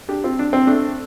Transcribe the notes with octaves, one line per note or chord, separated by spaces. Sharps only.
D4 G4
C4 F4
D4
C4
A3 D4